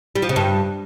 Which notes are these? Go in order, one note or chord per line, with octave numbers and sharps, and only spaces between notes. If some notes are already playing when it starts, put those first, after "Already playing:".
G3
F3
C#3
G2